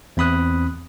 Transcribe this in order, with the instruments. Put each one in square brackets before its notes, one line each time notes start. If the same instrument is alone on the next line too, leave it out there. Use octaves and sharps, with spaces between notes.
[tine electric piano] E2 C4 B5 D#6 F#6